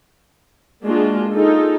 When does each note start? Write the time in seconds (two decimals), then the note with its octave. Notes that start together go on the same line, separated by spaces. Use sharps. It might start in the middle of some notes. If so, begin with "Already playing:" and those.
0.84 G#3 A#3 D4 F4 F#4
1.30 D#4 F4 G#4 A4